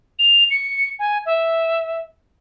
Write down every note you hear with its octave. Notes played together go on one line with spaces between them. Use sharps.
F7
C#7
G#5
E5